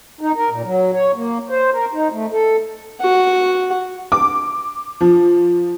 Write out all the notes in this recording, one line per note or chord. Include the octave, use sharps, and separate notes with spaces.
D#4
A#4
A#2
F#3
C#5
A#3
C5
A#4
D#4
A3
A4
F#4 F#5
D6
F3